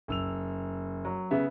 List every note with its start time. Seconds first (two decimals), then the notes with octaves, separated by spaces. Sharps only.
0.08 F#1 E6 F7
1.05 F#3
1.31 C#3 B3 E5